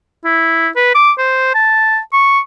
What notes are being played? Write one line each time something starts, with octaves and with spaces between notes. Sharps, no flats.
E4
B4
D6
C5
A5
C#6